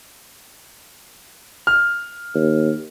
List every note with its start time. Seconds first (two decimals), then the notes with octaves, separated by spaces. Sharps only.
1.67 F6
2.35 D#2